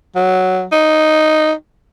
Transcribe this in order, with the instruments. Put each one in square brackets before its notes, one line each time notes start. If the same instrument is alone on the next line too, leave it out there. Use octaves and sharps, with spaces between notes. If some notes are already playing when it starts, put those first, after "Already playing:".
[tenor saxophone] F#3
D#4